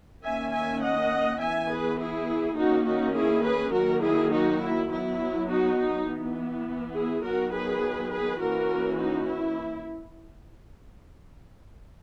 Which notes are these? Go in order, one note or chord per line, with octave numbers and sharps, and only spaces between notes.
D#3 A#3 C#4 E5 G#5
E5 G#5
D#5 F#5
E3 B3 E5 G#5
G#4 B4
E4 G#4
D#3 A#3 C#4 D#4 F#4
D#4 F#4
E4 G#4
G#4 B4
D#3 F#3 A#3 F#4 A#4
E4 G#4
D#4 F#4
E4
F#3 B3 E4
D#4 F#4
D#4
E3 B3
E4 G#4
D#3 F#3 B3 F#4 A#4
G#4 B4
G#4 B4
E3 A#3 C#4 F#4 A#4
D#4 F#4
E4